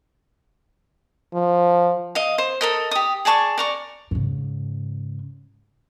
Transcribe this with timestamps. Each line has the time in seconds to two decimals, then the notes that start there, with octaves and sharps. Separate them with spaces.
1.34 F3
2.15 D#5 F5
2.38 C5
2.61 A4 A#4 D#5
2.91 G4 D#6
3.25 G#4 D5 A5 C#6
3.58 D5 A#5 C#6
4.11 G#2 C#3